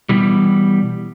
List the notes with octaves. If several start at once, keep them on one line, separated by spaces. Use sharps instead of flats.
B2 E3 G3